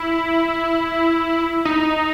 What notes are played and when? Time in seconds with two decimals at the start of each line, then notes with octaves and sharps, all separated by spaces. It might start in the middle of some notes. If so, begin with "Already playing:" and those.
Already playing: E4
1.65 D#4